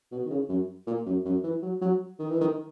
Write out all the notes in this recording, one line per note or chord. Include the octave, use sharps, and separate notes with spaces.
B2
D#3
C#3
F#2
A#2
F#2
F#2
E3
F#3
F#3
D#3
E3
D#3